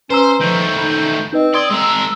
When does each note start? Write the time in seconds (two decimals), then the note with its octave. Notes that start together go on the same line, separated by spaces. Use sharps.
0.10 C#4 B4 C5 A#5 E6
0.41 D#3 F3 A3 G6
0.78 D#4 B5
1.33 C4 D#4 B4 D#5
1.54 D5 C6 D#6 G#6 G7
1.71 G#3 A#4 E6